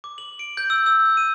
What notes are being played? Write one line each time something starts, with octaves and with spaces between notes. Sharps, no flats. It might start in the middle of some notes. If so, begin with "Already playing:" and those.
D6
F#7
D7
G6
E6
E6
D#7